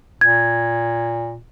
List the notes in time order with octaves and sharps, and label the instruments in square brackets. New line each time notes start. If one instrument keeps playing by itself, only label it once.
[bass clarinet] A#2 [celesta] G#6